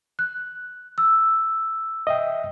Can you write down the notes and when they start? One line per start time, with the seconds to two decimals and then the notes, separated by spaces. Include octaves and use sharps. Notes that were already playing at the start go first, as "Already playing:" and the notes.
0.19 F#6
0.98 E6
2.07 D#5 E5 G5